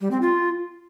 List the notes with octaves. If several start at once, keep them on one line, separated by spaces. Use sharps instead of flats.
G3
C4
F4